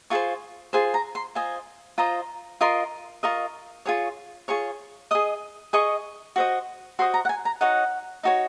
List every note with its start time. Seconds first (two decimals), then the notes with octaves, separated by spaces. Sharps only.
0.10 F4 G#4 C5 C#6
0.73 F4 G#4 C5 C6
0.94 A#5
1.15 C6
1.35 F4 C5 D#5 G#5
1.98 F4 C5 D#5 A#5
2.61 F4 A#4 D#5 C6
3.23 F4 A#4 D#5 C#6
3.86 F4 G#4 C#5 C#6
4.48 F4 G#4 C#5 C#6
5.11 G#4 D#5 D#6
5.73 G#4 D#5 C#6
6.36 F#4 C5 D#5 C#6
6.99 F#4 C5 D#5 C6
7.14 A#5
7.25 F#5
7.29 G#5
7.45 A#5
7.61 D#4 F#4 C#5 F#5
8.23 D#4 F#4 C#5